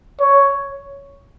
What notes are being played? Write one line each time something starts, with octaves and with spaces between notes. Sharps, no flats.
C#5